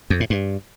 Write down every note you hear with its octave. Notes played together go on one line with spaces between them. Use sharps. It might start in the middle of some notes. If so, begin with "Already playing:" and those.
F2
A2
G2